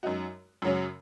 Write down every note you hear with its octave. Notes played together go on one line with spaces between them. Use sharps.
F#2 F#3 D#4 F#4
F#2 C#3 F#3 C#4